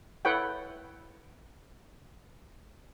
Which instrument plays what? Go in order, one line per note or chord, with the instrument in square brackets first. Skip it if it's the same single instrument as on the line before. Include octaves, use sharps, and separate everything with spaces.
[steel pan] E4 A4 B4 C#5 F#5 G5